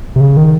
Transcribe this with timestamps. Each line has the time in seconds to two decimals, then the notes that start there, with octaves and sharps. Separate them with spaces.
0.16 C3
0.20 C#3
0.37 D#3